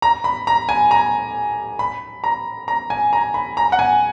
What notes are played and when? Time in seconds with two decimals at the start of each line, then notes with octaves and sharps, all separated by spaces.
0.02 A#5
0.24 B5
0.47 A#5
0.69 G#5
0.91 A#5
1.79 B5
2.24 A#5
2.68 A#5
2.90 G#5
3.13 A#5
3.34 B5
3.57 A#5
3.72 F#5
3.79 G#5